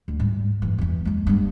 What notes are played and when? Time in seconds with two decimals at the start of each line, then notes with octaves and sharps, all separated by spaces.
0.08 D2
0.20 G#2 G3
0.62 F#2 E3
0.78 E2 E3
1.05 G#3 A#3
1.27 G2 B3